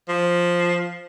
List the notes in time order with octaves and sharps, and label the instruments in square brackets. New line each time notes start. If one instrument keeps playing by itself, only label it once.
[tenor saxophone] F3